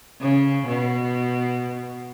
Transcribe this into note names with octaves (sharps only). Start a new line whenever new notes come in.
C#3
B2